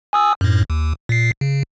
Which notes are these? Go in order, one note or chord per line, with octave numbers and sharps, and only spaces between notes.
G#5 D#6 E6
F#2 A2
D#2
A#2 C7
C#3